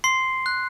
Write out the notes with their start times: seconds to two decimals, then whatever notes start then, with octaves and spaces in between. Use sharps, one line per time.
0.04 C6 C7
0.46 F#6